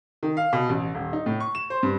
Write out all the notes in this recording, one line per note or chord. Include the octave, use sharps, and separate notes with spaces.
D#3
F5
B2
A1
D#1
D#4
A2
C#6
E7
C5
G2